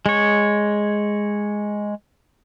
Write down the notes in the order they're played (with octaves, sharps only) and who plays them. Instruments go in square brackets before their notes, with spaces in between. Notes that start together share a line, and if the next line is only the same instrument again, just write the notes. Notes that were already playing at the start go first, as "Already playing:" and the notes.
[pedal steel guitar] G#3 C#5